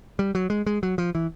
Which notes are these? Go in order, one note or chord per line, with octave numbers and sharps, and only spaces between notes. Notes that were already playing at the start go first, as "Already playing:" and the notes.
G3
F#3
G#3
G#3
F#3
F3
E3